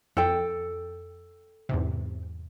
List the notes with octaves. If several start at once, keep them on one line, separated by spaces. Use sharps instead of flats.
F2 A4 G5
E2 G#2 C3